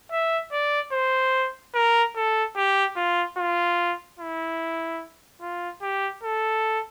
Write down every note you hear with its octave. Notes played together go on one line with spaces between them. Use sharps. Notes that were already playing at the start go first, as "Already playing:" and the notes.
E5
D5
C5
A#4
A4
G4
F4
F4
E4
F4
G4
A4